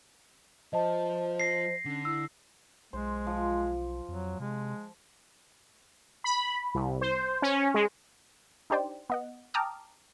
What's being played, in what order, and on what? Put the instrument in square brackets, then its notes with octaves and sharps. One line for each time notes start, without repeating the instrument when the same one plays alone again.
[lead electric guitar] F3 [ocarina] C5 [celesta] D#5 A5
[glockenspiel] A#6 C7
[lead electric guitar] D3 [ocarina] C#4
[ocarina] E4 [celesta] E6
[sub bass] B1 [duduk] G#3 [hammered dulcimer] C5
[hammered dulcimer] F3
[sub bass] F2 [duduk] F#3
[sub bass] C3 [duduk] G#3
[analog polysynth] B5
C2
C5
C#4
G#3
[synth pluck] D4 D#4 G4 C5 D5 G5
B3 D#5 F#5
G5 A5 A#5 D6 D#6 F6